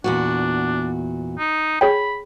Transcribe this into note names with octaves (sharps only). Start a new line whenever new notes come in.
E2 A#2 D4 F#4
D#4
G#4 C#5 G5 B5